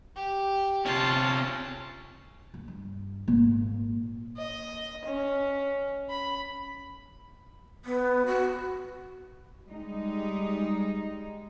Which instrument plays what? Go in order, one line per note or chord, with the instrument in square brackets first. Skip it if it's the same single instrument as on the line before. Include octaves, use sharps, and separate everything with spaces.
[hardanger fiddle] G4
[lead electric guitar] C3 C#4 [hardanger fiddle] F4 A5
[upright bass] D#2
G2
G#1 A#2
[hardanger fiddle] D#5
C#4
B5
[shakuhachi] B3
F#4
[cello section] G3 G#3 D#4